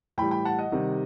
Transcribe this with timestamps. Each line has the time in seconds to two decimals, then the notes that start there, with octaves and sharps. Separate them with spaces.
0.18 A2 E3 G3 G5 B5
0.31 G5 B5
0.45 F#5 A5
0.58 D#5 F#5
0.72 C3 D#3 G3